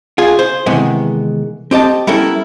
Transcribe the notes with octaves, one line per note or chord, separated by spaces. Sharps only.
F4 G#4
C5
C3 D#3 E3 G#3 B3
C4 G4 D#5 A5
G3 B3 C#4 E4 A4 A#4